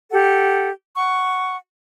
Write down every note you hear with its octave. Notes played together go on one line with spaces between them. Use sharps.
G4 A4 F#5
F#5 C#6